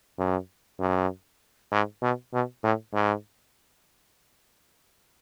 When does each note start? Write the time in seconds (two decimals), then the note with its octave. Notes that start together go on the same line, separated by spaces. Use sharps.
0.19 F#2
0.80 F#2
1.72 G#2
2.02 B2
2.33 B2
2.64 A2
2.94 G#2